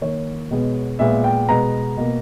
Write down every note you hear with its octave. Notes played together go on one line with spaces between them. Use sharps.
D#3 A#3 C#5
B2 G#3 B3
A#2 G#3 B3 E5
G5
B2 G#3 B3 A#5
B2 A#3